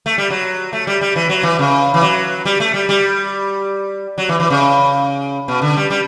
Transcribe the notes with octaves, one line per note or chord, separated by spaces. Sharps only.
A3
G3
F#3
A3
G3
G3
E3
F#3
E3
C#3
E3
F#3
G3
A3
G3
G3
F#3
E3
E3
C#3
B2
D3
G3
G3